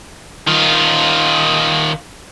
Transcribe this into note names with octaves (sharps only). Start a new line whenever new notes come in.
D#3 F4